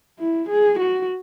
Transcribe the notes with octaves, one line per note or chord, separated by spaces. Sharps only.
E4
G#4
F#4